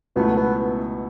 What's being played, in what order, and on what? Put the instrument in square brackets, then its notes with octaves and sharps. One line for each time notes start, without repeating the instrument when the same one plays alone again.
[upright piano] C#2 B2 F#3 A3 E4 [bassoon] B3
[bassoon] B3